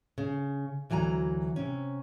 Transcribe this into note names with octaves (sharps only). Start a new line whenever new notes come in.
C#3
D2 E3 F#3 G#5 A#5
C3 C#4